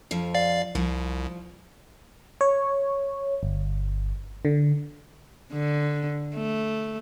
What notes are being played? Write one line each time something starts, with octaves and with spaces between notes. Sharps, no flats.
F2 F3
D5 F5
C2 F3
C#5
G1
D3
D3
A3